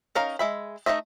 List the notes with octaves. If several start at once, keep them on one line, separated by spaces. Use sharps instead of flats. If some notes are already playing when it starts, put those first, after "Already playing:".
C#4 D#4 A#4 F5 A#5
G#3 E5 B5
A3 C4 D#4 D#5 E5